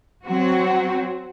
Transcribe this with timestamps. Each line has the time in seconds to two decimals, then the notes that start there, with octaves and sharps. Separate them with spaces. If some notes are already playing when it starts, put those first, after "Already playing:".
0.24 F#3 C4 F#4